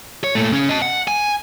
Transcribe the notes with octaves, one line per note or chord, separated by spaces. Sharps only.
C#5
A#2 A3
C#3 C#4
D#5 A5
F#5
G#5